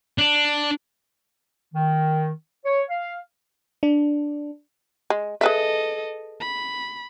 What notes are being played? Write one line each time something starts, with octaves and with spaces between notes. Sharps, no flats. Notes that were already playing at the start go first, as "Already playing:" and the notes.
D4
D#3
C#5
F5
D4
G#3
G#4 A4 B4 D#5 E5
B5